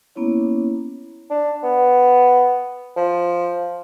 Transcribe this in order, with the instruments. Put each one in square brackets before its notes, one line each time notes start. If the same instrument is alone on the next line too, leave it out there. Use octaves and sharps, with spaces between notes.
[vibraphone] A#3 B3 C#4 E4 C#5
[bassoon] D4
B3
F3